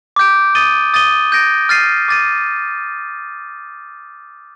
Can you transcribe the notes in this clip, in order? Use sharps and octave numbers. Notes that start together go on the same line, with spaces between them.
D6 G6 D7
D#6 A6 D#7 G7
D#6 A6 D#7 G7
G6 A#6 D7
F6 A6 C7 D#7
D6 A6 D#7